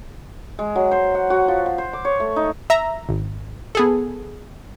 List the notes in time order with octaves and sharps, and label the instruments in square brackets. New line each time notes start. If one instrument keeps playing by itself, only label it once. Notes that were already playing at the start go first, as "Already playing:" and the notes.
[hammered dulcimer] G#3
F#3
C5
F#5
F#4
F3
F#5
C5
D6
C#5
A3
D#4
[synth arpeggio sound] E5 A#5
G#1
B3 G#4 A4